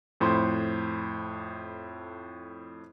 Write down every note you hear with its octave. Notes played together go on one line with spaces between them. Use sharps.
F2 A2 C5 B5 C6